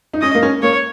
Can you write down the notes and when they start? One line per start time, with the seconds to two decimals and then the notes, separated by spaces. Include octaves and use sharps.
0.14 D#4
0.21 C#4 D#5
0.35 A#3
0.42 C#4
0.62 A#3 C#5